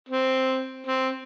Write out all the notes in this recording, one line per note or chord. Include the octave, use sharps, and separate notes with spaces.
C4
C4